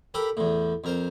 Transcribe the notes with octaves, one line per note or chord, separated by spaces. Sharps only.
G4 A4 A#4 B5
E2 A2
F2 A#4 C5